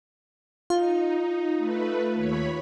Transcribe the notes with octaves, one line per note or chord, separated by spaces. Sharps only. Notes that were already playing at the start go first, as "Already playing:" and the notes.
D#4 F4
A3 B4
D#2 C#5 B5